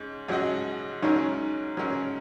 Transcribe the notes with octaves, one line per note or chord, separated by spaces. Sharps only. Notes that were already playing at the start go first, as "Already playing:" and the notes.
Already playing: G#2 C#4
G#2 F#3 C#4 F#4 D#5
G#2 F#3 C#4 D#4 A#4
G#2 F#3 C#4 A#4